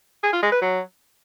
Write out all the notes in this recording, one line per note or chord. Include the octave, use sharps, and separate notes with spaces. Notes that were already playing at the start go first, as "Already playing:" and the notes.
G#4
F4
G#3
B4
F#3